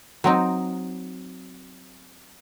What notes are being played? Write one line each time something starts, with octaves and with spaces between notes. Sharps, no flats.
F#3 C4 D#4